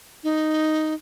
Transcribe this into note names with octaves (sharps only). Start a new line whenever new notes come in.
D#4